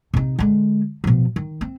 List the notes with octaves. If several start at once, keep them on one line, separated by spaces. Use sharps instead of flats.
C3 D#4
D3 G#3
B2 F3
D#3
C4